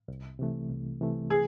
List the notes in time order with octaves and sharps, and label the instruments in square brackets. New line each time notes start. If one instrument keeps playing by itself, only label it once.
[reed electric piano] C2
C3 E3 A3
C2
C3 E3 A3
[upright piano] G#4